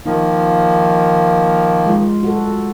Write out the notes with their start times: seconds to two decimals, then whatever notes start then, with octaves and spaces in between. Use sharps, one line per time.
0.06 D#3 F3 A#3 D#4
1.86 G#3 F4
2.23 F#4 A4